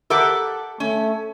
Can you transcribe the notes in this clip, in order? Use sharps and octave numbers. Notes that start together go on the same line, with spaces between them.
G4 A4 A#4 E5 F#5 D6 E6
A3 C#4